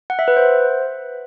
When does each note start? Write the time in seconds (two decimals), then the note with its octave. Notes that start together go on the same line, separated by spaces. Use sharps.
0.10 F#5
0.19 E5
0.28 B4
0.37 C5